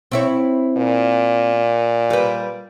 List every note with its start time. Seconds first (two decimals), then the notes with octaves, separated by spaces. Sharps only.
0.11 C4 E4 C#5
0.77 A#2
2.10 G3 B4